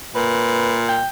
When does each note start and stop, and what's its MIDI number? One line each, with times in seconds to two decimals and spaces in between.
0.15 1.02 46
0.15 0.81 71
0.89 1.09 79